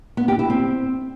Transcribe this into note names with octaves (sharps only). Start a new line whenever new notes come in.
B3
G4
E4
C4